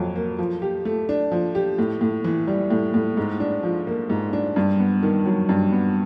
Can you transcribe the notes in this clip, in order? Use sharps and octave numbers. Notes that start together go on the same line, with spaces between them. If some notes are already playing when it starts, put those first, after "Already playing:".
Already playing: F2 F#3
A#3
F3
G4
A3
D4
F3
G4
A2
A2
E3
G3
A2
A2
G#2
D4
F3
A#3
G#2
D4
G2
B3
D#3
F#3
G2
B3